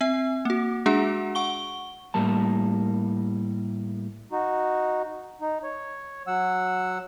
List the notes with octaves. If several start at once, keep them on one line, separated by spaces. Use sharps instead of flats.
C4 E5
A#3 F#4
G#3 D4 F#4 G#4 F#5
F#5 C#6 G7
A2 G3 A#3 A5
D#4 F#4
D#4
C#5
F#3 F#5 E6